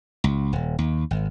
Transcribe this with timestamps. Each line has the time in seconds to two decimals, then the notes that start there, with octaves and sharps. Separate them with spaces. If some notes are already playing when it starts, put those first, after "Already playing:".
0.24 C#2
0.53 D#1
0.79 D#2
1.11 G#1